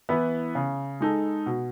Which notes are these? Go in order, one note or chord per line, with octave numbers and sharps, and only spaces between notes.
E3 B3 E4 B4
C#3
G#3 D#4 A4
B2